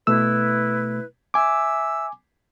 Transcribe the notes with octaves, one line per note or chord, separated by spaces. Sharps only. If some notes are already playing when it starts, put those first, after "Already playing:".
B2 A3 E4 B4 E6
E5 G#5 D6 E6